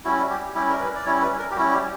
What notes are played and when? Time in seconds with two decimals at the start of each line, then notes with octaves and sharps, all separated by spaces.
0.05 G3 C#4 E4 F#4
0.30 G4
0.55 G3 C#4 E4 G4
0.70 A#4
0.80 B4
0.96 D5
1.05 G3 C#4 E4 C#5
1.22 B4
1.39 A#4
1.51 G4
1.56 G3 C#4 E4 F#4
1.73 G4